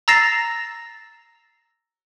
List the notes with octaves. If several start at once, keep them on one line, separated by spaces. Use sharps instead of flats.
A#5 E6 A6 A#6 C7 E7